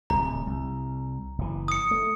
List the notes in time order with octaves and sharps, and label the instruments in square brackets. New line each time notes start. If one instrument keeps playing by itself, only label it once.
[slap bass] D1 C2 [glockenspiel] A#5
[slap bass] C2
F#1 E3
[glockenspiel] D#6 C#7
[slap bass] A3